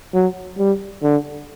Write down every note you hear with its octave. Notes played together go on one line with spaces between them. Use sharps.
F#3
G3
D3